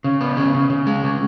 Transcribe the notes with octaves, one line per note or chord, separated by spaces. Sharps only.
C#3
B3
C#3
C#3
C#3
G#3
C#3